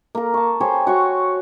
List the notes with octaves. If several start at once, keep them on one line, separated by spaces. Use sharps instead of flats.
A#3 A#4
A5 C#6
G4 C5 C#5 G#5
F#4 C#5 C#6